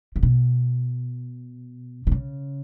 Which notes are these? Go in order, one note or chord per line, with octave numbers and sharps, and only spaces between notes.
C#3
B2
B2
C#3